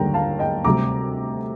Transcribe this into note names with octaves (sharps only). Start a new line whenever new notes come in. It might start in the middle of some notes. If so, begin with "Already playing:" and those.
Already playing: D#2 D3 G3 G5 A#5
F5 A5
D#5 G5
D2 C3 G3 A#5 D6